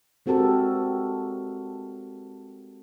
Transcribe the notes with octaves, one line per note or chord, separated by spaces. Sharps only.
G#3 C4 F#4 G4 A4 A#4